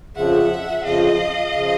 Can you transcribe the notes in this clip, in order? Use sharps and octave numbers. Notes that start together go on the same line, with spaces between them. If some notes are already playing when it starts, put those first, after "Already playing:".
F2 C#3 F3 E5 F#5
F2 C#3 F3 D#5 F5
C#3 F3